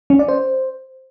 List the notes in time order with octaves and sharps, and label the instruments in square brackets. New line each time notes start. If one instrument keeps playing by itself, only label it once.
[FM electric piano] C#4
D5
C5